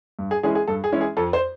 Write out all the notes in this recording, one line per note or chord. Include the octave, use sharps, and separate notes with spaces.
G2
G#4
E3 G#3 C#4 E4 G#4
G#4
G2 A4
G#4
E3 G#3 C#4 E4
G#4
F2 A4
C5